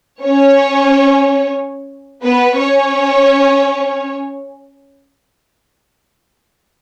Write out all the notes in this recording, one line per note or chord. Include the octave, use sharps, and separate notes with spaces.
C#4 C#5
B3 B4
C#4 C#5